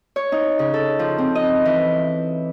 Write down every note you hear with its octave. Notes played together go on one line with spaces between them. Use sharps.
C#5
D#4
C#3
A4
F3
C4
D#5
E3